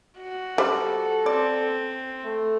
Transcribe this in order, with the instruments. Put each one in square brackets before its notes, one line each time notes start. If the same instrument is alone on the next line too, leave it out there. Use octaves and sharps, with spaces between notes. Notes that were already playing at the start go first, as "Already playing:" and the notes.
[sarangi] F#4
[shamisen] G3 C5 [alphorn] A4
[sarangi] C4 [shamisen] D5
[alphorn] A3